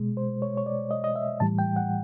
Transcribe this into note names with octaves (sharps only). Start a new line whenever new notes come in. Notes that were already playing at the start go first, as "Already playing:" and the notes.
Already playing: B2 G#3
C5
C#5
C#5
D5
D#5
D#5
E5
A2 E3 G3 A5
G5
F#5